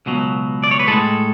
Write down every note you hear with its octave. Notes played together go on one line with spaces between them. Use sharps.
C#2 B2 F#3
D5
C#5
B4
A2 G#3 A4